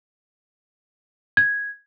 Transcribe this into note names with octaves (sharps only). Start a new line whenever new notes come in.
G#6